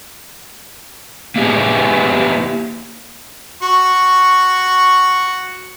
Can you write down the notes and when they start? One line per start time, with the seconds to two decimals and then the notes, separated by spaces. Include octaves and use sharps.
1.36 A#3 B3 E4 G4 G#4 G#5
3.62 F#4 C#6